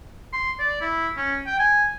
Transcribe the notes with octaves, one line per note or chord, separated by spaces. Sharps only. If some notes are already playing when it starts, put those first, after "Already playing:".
C6
D5
E4
C#4
G5
G#5